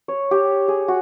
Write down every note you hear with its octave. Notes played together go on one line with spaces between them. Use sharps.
C#5
G4
G#4
F#4